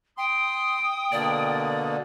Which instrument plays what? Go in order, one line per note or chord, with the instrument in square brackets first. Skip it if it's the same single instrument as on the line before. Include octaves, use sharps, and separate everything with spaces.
[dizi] G5 [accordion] C6 [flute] D#6
[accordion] B2 D3 A#3 [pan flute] D5